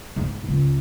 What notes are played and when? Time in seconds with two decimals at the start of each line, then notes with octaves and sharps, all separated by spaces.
0.16 G#2 B3
0.49 C#2